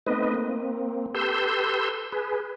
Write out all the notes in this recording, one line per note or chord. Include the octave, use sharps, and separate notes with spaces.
A3 B3 C4 D#4 B4 D#5
A#3 C4
G4 A4 B4 C6 E6 G6
G#4 B4